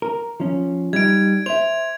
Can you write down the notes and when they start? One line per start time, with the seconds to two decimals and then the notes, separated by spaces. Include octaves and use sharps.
0.02 A#4
0.40 F3 C#4
0.93 G3 D#4 G#6 D7
1.46 C5 E5 F7